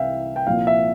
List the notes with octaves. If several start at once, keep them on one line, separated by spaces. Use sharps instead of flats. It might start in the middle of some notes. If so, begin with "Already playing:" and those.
Already playing: C2 C3 E3 E5 F5 G5
G5
C2 A#2 F3 F5
E5